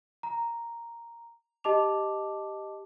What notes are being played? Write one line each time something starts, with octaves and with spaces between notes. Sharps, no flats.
A#5
G4 D#5 A5 D6 F7